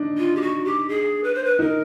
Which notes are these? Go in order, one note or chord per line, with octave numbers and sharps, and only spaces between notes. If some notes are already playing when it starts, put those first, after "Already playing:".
Already playing: D4 D#4
F4
G4
F#4
G4
G#4
B4
C5
B4
D#4 A#4